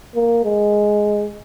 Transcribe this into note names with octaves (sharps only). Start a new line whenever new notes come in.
A#3
G#3